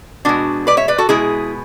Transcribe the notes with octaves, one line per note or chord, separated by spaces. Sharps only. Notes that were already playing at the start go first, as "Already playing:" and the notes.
B2 G#3 D4 F#4
B4 D5
C#5 E5
B4 D5
F#4 A4
B2 G#3 E4 G#4